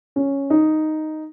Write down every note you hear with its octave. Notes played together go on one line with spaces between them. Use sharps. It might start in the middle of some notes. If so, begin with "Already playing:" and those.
C#4
D#4